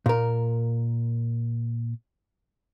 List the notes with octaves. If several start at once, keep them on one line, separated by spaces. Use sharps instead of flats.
A#2 A#4